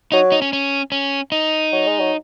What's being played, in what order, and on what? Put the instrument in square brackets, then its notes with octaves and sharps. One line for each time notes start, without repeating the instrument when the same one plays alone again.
[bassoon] F#3 [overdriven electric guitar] D#4
[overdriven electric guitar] D#4
C#4
C#4
C#4
D#4
[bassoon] F#3
G#3
F#3